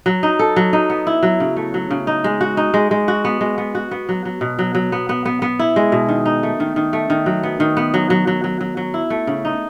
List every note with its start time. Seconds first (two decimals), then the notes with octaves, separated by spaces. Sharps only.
0.06 F#3
0.23 D#4
0.39 A4
0.56 F#3
0.73 D#4
0.90 B3
1.07 E4
1.23 F#3
1.40 C#3
1.56 A3
1.74 F#3
1.91 C#3
2.07 D#4
2.24 G#3
2.41 F#4
2.57 D#4
2.74 G#3
2.91 G#3
3.08 F#4
3.25 B3
3.41 G#3
3.58 B3
3.75 F#4
3.91 B3
4.09 F#3
4.25 F#3
4.41 B2
4.59 F#3
4.75 F#3
4.92 B3
5.09 B3
5.25 B3
5.42 B3
5.59 E4
5.76 G#3
5.92 B2
6.08 D#3
6.26 D#4
6.43 A3
6.60 D#3
6.76 D#3
6.93 A3
7.10 D#3
7.26 F#3
7.43 B3
7.60 D#3
7.77 B3
7.94 F#3
8.10 F#3
8.27 F#3
8.44 F#3
8.61 F#3
8.77 F#3
8.94 E4
9.10 A3
9.27 C#3
9.45 D#4